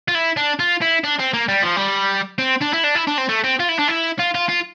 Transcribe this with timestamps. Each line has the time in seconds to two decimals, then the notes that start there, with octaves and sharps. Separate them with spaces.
0.08 F4
0.15 E4
0.37 D4
0.59 F4
0.82 E4
1.04 D4
1.19 C4
1.34 A#3
1.49 G3
1.63 F3
1.77 G3
2.38 C4
2.61 D4
2.73 E4
2.83 D4
2.95 E4
3.07 D4
3.18 C4
3.29 A3
3.44 C4
3.60 F4
3.69 E4
3.78 D4
3.88 E4
4.19 F4
4.35 F4
4.49 F4